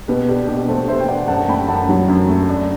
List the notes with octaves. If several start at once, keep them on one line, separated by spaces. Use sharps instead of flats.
B2 G4 B4
D4 G4
B2 G4
A3 A4 C5
B2 C5 E5
G5
D4 D5 F#5
F#2 F#5 A5
A3 G5 B5
F#2 F#5 A5
F#3
F#2
A3
D4